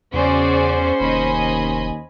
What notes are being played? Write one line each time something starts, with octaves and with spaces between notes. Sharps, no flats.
E2 C#3 C#4 F#4 G#4 C5 D5
F1 D#2 D#5 G#5 B5